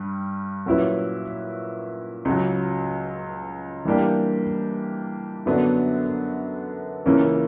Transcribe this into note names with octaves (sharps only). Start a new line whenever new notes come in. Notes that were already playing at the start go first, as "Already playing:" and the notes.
Already playing: G2 G3
A#2 F#3 C#4 E4 B4
C#2 C#3 F#3
E3 G3 A#3 D4 G4
F#2 D3 F#3 B3 D4
C#2 C#3 E3 A#3 C#4